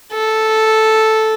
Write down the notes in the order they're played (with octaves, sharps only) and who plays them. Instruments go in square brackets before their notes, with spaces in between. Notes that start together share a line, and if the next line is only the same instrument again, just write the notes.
[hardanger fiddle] A4